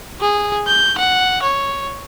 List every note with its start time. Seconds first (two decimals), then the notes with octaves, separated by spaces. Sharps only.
0.21 G#4
0.67 G6
0.98 F#5
1.42 C#5